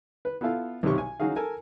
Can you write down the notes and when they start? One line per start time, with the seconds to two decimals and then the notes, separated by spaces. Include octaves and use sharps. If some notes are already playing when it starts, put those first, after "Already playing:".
0.25 B4
0.41 B3 E4 F4 A4 F5
0.83 B1 C3 D#3 G4 C#6
0.98 G#5
1.20 F#3 C#4 D#4 F#4 G#4 F5
1.36 A4 A#4 G#5